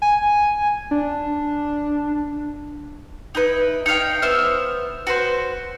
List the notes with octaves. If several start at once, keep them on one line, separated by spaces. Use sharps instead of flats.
G#5
D4
D#4 E4 B4
D#4 C#5 F5 G5
B3 C5 E5 F6
F#4 B4 C5